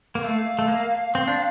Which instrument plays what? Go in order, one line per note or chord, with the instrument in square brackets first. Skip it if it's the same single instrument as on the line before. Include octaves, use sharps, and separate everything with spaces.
[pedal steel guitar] A#3
[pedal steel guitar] A3 [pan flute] F5
[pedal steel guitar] A3
A#3
C4
D4